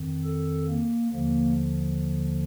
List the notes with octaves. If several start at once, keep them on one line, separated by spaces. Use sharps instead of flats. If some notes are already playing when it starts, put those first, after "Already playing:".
Already playing: F2 D#3
A4
A#3
D#2 D3 F3 A#3